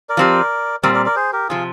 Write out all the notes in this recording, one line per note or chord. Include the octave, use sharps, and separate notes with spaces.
A#4 D5
F3 C4 G4
A#2 G3 C4 A#4 D5
A#4 D5
A#4 D5
G#4 C5
G4 A#4
C3 F3 F4 G#4